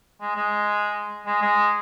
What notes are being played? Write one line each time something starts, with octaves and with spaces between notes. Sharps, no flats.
G#3
G#3
G#3
G#3